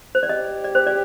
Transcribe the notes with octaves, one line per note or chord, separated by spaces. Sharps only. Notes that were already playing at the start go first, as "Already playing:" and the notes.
C5
D5
G4 D#5
D5
C5
D5